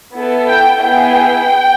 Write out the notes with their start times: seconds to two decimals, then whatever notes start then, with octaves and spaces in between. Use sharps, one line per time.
0.13 B3 E4 A4
0.47 G5
0.81 B3 E4 G#4 G5